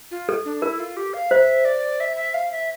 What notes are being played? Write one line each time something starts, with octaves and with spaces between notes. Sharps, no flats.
F4
A4
D4
E4 A#4
F4
G4
F5
C5 E5
D5
E5
E5
F5
E5